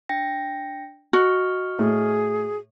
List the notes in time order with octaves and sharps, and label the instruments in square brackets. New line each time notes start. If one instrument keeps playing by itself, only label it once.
[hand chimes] D4 G5 A#6
[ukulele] F#4 [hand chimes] D#5 C#6 F6
[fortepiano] A2 [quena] G#4